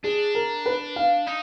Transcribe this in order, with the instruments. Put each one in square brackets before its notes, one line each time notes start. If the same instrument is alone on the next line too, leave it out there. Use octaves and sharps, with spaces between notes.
[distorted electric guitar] D4 [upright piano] G#4
[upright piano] A#4
B4
F5
[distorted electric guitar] D#4